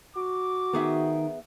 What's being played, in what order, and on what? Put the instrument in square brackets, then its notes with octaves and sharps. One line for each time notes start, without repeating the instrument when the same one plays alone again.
[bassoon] F#4 [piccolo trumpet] D6
[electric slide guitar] D#3 [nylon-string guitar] B3 G#4 E5